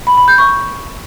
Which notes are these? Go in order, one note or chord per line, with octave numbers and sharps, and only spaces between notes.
B5
B5
G6
C#6